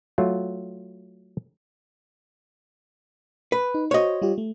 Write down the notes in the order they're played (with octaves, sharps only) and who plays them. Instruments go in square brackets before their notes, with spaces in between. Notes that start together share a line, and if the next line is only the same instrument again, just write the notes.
[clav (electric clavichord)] F#3 A3 F4
[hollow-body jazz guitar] B4
[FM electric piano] D#4
[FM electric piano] F#4 C5 [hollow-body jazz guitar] C#5 D#5
[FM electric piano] G3 F4 G4
A3